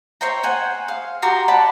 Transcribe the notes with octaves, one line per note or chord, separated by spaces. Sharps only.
C5 C#5 G5 A#5
C5 F#5 G#5
F5
F#4 G4 A#5 C6
D5 F#5 A5 B5